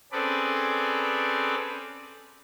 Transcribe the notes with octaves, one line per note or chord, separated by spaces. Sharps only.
C4 C#4 G#4 A4 B4 D5